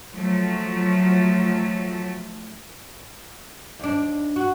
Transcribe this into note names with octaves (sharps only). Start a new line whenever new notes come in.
F3 F#3 A3
D#2 D4
F#4